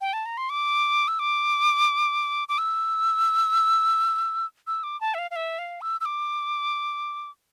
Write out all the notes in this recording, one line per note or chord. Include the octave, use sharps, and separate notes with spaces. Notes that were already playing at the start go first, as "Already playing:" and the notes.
G5
A5
A#5
C6
D6
E6
D6
D6
E6
E6
D6
A5
E5
F5
F5
E5
F5
E6
E6
D6